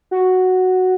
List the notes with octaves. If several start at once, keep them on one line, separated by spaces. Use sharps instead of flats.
F#4